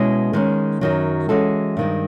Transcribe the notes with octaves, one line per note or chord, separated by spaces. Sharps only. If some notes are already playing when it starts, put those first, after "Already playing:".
Already playing: B2 G#3 C#4 E4 G#4
D#3 G#3 C#4
F#2 D#3 F#3
E3 G#3 C#4 F#4 A4
G2 D#3 G#3 C4